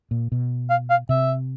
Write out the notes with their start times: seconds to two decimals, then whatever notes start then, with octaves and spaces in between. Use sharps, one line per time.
0.11 A#2
0.32 B2
0.70 F5
0.90 F5
1.09 C3 E5